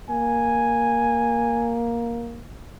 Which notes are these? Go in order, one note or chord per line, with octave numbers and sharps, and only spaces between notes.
A#3 G#5